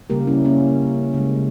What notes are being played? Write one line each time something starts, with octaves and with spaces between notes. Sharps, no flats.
C#3 G3 A#3 G4 A#4
C#4 E4
A#3 C#4
C#3 G#3